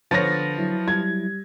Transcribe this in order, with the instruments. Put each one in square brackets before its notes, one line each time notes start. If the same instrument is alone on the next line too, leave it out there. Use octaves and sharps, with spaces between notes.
[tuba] D3 [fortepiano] F3 B3 C#5 [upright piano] A6 A#6
[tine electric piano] F#3 E4
[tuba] G3 [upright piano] G#6